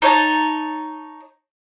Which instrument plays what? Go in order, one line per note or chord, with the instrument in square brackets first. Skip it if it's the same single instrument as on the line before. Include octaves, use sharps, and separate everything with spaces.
[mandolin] D#4 C#5 A5